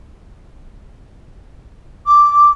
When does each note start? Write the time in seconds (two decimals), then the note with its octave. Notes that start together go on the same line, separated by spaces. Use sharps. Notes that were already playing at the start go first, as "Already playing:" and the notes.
2.06 D6